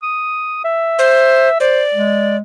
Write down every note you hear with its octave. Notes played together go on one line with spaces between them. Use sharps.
D#6
E5
C5
C5 D5
G#3